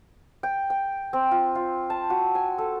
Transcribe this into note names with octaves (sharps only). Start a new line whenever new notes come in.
G5
G5
C4
F4
F4
A5
F#4
G#5
A4